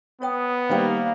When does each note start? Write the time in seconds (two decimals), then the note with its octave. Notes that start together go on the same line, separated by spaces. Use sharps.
0.22 B3 C#5 G5 D#6
0.70 D#3 G3 A#3 C5 F5 G5